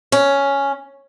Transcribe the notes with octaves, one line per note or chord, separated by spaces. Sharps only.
C#4